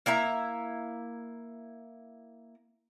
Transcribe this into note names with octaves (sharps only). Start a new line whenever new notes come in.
A#3 E4 E5 A#5